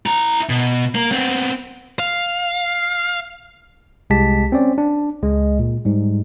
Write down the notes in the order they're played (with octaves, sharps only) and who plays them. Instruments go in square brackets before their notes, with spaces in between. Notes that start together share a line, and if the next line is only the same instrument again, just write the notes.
[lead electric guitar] E4 A#5
B2
A#3
B3 C4
F5
[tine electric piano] C2 G#3 G4 A5 B6
C4 C#4 D5
D4
C#2 G#3 D#5
A#2
G#2 G3